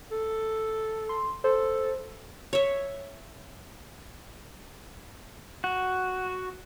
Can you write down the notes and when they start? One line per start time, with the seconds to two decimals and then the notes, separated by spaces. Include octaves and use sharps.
0.11 A4
1.09 C6
1.44 A4 C5
2.53 C#5 E5
5.64 F#4